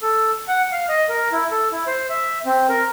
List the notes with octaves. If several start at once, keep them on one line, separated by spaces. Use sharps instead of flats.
A4
F#5
F5
D#5
A#4
E4
A4
E4
C5
E5
C4
A#4